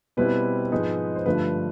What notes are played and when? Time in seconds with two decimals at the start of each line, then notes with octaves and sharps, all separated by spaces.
0.17 B2 G3 C4 E4 B4
0.72 G#2 F3 G#3 B3 D#4
1.16 C5
1.26 G2 D3 F3 A3 B4